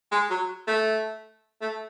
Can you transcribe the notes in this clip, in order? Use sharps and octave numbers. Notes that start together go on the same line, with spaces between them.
G#3
F#3
A3
A3